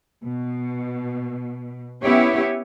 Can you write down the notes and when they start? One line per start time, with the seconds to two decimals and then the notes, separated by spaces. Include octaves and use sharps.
0.24 B2
2.02 B3 C#4 E4 G4 C#5